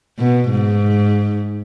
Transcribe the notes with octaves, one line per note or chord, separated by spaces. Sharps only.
B2
G#2